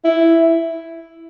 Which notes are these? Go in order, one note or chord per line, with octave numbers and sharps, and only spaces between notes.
E4